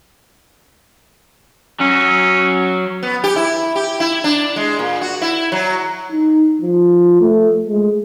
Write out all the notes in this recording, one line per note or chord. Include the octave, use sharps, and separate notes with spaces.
F#3 C#4
B3
G4
E4
G4
E4
D4
G#3
A#2
F#4
E4
F#3
D#4
F3
A3
G#3